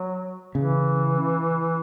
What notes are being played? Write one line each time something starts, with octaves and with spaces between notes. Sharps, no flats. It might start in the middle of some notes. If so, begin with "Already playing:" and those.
Already playing: F#3
C#3 E3